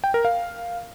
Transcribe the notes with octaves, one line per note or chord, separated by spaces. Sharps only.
G5
A#4
F5